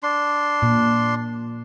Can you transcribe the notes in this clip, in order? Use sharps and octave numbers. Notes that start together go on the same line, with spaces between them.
D4 C6
A#2